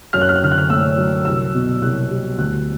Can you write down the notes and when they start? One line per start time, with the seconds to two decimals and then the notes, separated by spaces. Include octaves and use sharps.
0.13 F#2 F6
0.21 F#6
0.29 F6
0.35 F#6
0.42 D3 F6
0.51 F#6
0.58 F6
0.70 A3 E6
0.97 F#3
1.25 C2 E6
1.54 B2
1.82 C2 F#6
2.11 G3
2.37 D2 F#6